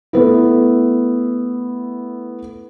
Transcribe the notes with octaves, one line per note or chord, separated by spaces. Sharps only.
A3 B3 E4